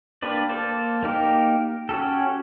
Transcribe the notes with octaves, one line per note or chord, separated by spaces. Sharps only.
A#3 D4 G4 B4 D5
A#3 A4 C5 D5
A#3 D#4 G4 A#4
C#4 F#4 G4 A4